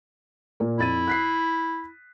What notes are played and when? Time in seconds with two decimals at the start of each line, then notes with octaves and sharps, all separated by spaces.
0.60 A#2 A#3
0.79 F2 E4 A6 D#7
1.08 F#6 B6 C7